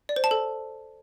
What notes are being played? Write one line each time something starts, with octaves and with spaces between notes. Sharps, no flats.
D5
C5
A5
A4